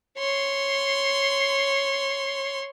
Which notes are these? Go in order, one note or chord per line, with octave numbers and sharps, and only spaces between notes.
C#5 C6